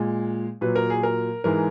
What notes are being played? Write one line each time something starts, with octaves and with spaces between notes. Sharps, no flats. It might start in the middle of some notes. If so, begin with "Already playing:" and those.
Already playing: A#2 G#3
A#2 F#3 B4
A#4
G#4
A#4
G#2 E3 G#3 A#4